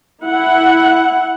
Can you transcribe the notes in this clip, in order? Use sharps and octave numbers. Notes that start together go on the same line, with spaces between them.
E4 F#5